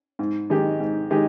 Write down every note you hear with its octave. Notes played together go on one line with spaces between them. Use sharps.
G#2
D#3 G#3 D#4 G4
G#2
D#3 G#3 D#4 G4